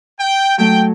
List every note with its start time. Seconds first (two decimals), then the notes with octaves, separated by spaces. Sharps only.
0.20 G5
0.58 F#3 A3 G5